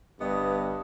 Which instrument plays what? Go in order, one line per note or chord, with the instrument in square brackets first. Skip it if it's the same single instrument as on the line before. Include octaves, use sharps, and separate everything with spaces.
[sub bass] G1 [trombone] G2 [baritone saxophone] B3 [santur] D#5